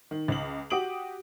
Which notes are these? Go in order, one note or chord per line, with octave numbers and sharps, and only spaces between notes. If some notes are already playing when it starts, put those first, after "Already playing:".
D#3
C#2 F#7
F#4 G4 D#6 D7 F#7